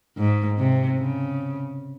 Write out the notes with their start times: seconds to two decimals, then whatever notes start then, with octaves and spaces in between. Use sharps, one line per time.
0.17 G#2
0.58 C3
0.99 C#3